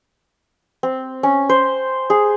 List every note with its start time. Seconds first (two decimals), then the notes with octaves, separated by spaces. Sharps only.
0.83 C4
1.23 C#4
1.49 C5
2.10 G#4